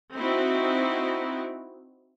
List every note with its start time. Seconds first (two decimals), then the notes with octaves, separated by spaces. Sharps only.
0.14 C4 D#4 E4 F#4